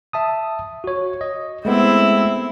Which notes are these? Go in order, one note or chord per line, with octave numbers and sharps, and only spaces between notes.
E5 A5 D#6
F#4 C#5
D#5
G#3 A3 B3 C4 E4